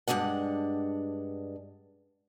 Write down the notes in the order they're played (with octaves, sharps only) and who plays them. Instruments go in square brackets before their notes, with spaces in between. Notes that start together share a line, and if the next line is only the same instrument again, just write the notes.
[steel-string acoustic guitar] G2 D3 G#3 D4 F#5